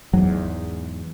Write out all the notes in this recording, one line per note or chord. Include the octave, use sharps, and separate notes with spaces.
E2 G#2 F#3